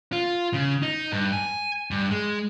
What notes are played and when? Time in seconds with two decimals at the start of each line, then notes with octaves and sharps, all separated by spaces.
0.13 F4
0.54 C#3
0.83 D#4
1.12 G2
1.32 G#5
1.91 G2
2.10 G#3